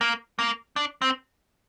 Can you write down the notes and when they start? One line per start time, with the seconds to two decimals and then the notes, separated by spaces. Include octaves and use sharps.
0.01 A#3
0.39 A#3
0.76 D4
1.02 C4